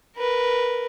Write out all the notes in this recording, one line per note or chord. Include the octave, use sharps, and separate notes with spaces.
A#4 B4